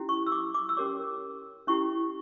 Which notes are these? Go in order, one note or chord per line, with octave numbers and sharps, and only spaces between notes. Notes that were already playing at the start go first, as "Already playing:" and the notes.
Already playing: C#4 E4 G4
C#6
E6
D6
D6
E6
C#4 G4 A#4 C#5 D6
C#4 E4 G4 C#6